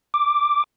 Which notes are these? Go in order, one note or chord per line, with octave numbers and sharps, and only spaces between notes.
D6